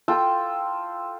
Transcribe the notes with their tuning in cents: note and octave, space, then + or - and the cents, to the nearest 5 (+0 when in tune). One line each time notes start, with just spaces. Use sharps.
F4 +0 A4 +0 G5 +0